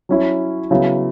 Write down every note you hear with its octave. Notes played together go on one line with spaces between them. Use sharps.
F#3 C#4 E4
C#3 F#3 B3 E4